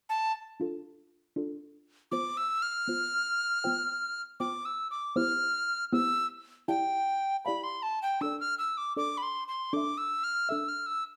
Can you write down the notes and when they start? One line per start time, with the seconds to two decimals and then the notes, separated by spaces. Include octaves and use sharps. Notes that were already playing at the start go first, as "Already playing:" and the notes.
0.09 A5
0.60 D4 F4 A4
1.36 D4 F4 A4
2.12 B3 F4 C5 D6
2.37 E6
2.62 F6
2.88 B3 F4 C5
3.64 B3 F4 C5 G5
4.40 B3 F4 C5 G5 D6
4.65 E6
4.91 D6
5.16 B3 E4 G4 C5 F6
5.93 B3 E4 G4 C5 E6
6.68 E4 G4 D5 F5 G5 A5
7.45 E4 G4 D5 F5 A5 B5
7.63 C6
7.83 A5
8.02 G5
8.21 D4 A4 D5 E6
8.40 F6
8.58 E6
8.77 D6
8.97 D4 A4 D5 D6
9.18 B5
9.23 C6
9.48 C6
9.73 D4 A4 E5 D6
9.98 E6
10.24 F6
10.49 D4 A4 E5 E6
10.68 F6
10.86 E6